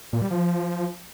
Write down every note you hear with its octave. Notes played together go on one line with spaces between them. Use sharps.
A#2
G3
F3